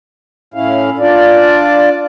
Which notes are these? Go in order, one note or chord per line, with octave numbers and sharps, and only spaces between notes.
A2 C#4 E4 F5
D4 F4 D5